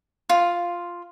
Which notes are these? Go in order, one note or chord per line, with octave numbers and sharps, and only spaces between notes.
F4